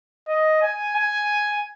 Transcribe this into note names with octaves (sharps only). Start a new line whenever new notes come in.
D#5
G#5
G#5